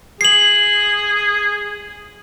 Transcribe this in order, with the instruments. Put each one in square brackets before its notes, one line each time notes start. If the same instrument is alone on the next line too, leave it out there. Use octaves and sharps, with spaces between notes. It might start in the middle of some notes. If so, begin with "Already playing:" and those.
[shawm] G#4 [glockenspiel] C7 F#7